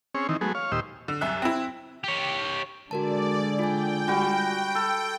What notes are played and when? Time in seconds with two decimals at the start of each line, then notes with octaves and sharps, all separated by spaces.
0.15 C4 C#4 G#4 C#5
0.29 D#3 E3 C4 D#4
0.41 F#3 G#3 A3 B3 G#4
0.55 C#5 F5
0.72 D#2 A#2 G4 C5 D#5 E6
1.08 D3
1.21 C2 F#2 E5 F#6
1.42 C4 E4
2.04 G4 C#5
2.91 D3 G#3 F#4 A#4 D5 A5
3.59 F4 G5 G#5
4.08 G3 F#4
4.75 A4